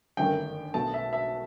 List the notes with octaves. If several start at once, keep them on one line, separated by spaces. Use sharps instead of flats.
G1 F#2 D#3 A3 G5
B1 B2 A3 A5
E5
E5